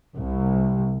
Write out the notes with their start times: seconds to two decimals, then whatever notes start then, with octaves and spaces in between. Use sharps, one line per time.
0.16 C2